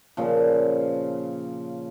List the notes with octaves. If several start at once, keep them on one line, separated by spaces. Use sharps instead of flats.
A#2 C#3 F3